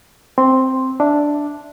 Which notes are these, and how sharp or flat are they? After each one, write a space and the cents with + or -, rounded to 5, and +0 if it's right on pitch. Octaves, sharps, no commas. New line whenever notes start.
C4 +0 C6 +5
D4 +0 E5 +0